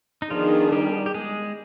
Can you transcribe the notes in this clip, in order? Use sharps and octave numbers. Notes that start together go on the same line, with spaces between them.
D#4
D#3 F3 B3 D4 F4 G#4
G3 G4
G4
G#3 G#4